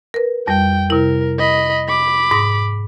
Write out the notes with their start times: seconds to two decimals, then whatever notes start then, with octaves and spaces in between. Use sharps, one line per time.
0.14 A#4 B4
0.47 F2 G3 G5
0.90 C3 E4 A#4
1.38 D#5 B5
1.88 B5 D6
2.31 G#2 D#6 A#6